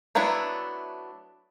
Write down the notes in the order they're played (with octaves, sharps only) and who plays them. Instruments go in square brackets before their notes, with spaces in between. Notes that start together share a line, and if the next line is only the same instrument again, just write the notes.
[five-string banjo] F#3 A3 B3 D4 E4